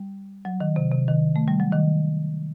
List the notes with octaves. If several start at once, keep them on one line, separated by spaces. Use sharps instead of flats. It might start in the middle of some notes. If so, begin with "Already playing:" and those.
Already playing: G3
F#3
D#3
C3
C3
D#3
A3
G3
F#3
D#3